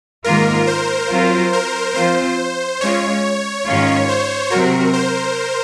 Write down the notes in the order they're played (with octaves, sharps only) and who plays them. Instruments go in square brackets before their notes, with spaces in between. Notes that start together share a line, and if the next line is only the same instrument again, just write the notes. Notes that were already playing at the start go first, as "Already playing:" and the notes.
[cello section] G#2 D#3 A#3 F4 [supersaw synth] A#4
[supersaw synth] C5
[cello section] F#3 C4 F4 A#4
[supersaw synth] A#4
[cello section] F3 C4 F4 [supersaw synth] C5
[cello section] G#3 C#4 F4 [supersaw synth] C#5
[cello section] G#2 D#3 G#3 C#4 F4
[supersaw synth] C5
[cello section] C3 F#3 C4 F#4 [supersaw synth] A#4
[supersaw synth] C5